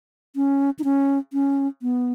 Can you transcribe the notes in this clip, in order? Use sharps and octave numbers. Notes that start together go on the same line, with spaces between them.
C#4
D#4
C#4
C#4
B3